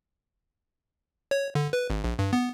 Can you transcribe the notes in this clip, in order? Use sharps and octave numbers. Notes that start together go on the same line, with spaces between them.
C#5
D3
B4
G#1
A#1
G2
B3